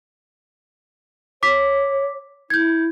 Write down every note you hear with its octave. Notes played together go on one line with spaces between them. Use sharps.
C#5 D6 B6
E4 G6 G#6